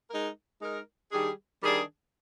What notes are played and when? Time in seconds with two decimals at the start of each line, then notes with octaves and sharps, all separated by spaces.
0.10 G#3 D#4 A#4
0.61 G#3 D#4 A#4
1.12 D#3 G3 D4 G#4
1.63 D#3 G3 D4 G#4